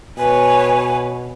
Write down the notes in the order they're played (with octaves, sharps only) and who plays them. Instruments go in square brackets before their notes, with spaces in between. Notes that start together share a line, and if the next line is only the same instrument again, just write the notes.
[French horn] B2 [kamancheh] B4 C#5 [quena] G#5